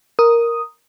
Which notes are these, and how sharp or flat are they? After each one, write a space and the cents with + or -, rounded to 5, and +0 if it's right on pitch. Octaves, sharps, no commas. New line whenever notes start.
A#4 +0 D#6 +0